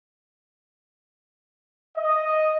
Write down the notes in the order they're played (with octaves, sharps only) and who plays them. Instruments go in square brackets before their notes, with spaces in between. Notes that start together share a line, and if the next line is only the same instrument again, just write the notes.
[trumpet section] D#5